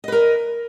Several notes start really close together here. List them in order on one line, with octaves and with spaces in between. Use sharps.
D#5 B4 A#4